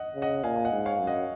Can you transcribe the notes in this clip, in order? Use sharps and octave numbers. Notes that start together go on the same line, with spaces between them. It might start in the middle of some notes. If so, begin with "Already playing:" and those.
Already playing: D#5 F#5
C#3
D#5 F#5
A#2 F5 G#5
G#5
D#5 F#5
G#2
C#5 F5
F#2
D#5 F#5